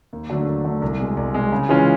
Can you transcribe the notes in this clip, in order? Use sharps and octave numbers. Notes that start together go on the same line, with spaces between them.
D#2
D3 F#3 A3 D4
D#2
D3 F#3 A3 D4
C2
B2 G#3
C2
B2 G#3
C#3
E3 G#3 C#4 F4